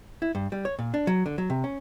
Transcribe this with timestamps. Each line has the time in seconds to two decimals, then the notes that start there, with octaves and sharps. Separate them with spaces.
0.22 E4
0.35 G2
0.52 G3
0.65 C#5
0.79 A#2
0.94 D4
1.07 F#3
1.26 D3
1.38 F#3
1.50 C3
1.64 C#4